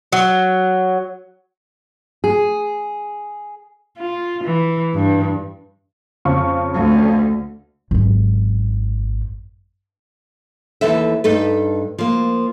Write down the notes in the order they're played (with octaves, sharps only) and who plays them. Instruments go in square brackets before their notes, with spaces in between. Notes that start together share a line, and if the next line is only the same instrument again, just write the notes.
[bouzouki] F#3
[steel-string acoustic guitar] G#4
[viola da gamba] F4
E3
G2
[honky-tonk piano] F2 C#3 C#6
[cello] D2
[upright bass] G#1 F#2
[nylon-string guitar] D#2 G#2 E3 A4 B4 E5
G2 D#4 A4 B4
F3 A#3